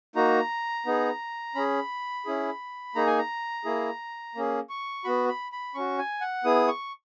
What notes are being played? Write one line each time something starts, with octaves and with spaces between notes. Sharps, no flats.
A#3 D#4 F#4 A#5
B3 D#4 G#4
C#4 G#4 B5
C#4 E4 G#4
A#3 D#4 G#4 A#5
G#5
A#5
A#3 E4 G#4
A#3 C#4 G#4
C#6
B3 F#4 B5
B5
B5
C#4 F#4 C#6
G#5
F#5
B3 E4 G#4 D#6
C#6